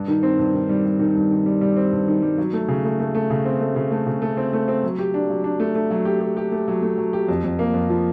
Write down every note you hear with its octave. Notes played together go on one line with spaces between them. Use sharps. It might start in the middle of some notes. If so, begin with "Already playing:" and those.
Already playing: G2
D#3
C4
G2
D#3
G3
G3
D#3
G2
D#3
G3
G3
C4
G2
D#3
G3
F#3
A3
C#3
A3
A3
A3
C#3
C4
A3
C#3
A3
C#3
A3
C4
A3
C4
F#3
G4
D4
F#3
D4
A3
A3
F#3
G4
G4
G4
A3
F#3
A3
F#3
G4
F2
F2
A#3
F2
F3